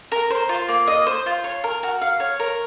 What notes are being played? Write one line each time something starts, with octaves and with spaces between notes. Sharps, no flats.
A#4
C5
F4
A#3
D#5
C5
F4
C#5
A#4
F#4
F5
C#5
A#4